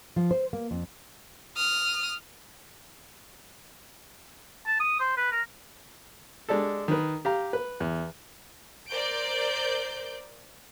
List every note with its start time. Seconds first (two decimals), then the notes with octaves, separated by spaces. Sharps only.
0.16 F3
0.31 C5
0.53 A#3
0.71 F2
1.56 D#6 F6
4.66 A5
4.80 D#6
5.00 C5
5.17 B4
5.32 A#4
6.49 G#3 D4 G4 A4
6.88 D#3 B4
7.25 G4 F5 A#5
7.53 B4
7.80 E2
8.88 A#4 C5 D5 G6 D7